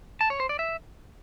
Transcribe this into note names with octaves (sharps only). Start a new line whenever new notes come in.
A5
C#5
C5
D5
E5